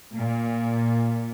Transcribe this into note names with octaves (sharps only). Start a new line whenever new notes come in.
A#2